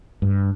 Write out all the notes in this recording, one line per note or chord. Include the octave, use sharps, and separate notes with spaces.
G2